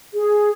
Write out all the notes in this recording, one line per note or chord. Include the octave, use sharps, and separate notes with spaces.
G#4